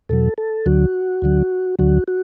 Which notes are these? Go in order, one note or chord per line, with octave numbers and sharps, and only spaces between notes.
E2 B2 F#3 A4
A4
D2 D3 F#3 F#4
D2 D3 F#3
D2 D3 F#3 F#4
F#4